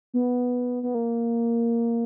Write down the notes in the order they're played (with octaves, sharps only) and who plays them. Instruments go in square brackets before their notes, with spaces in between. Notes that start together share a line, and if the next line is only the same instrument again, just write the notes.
[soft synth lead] B3
B3
A#3